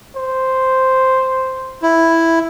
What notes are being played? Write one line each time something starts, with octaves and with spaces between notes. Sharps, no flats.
C5
E4